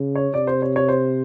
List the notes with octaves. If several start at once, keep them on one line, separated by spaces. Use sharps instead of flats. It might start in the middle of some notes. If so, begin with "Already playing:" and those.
Already playing: C#3
C#5
C3 D5
C5
C#5
C#5
C5